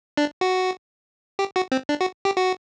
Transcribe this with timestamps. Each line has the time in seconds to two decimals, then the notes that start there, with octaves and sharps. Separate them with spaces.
0.17 D4
0.41 F#4
1.39 G4
1.56 F#4
1.72 C4
1.89 D4
2.01 F#4
2.25 G4
2.37 F#4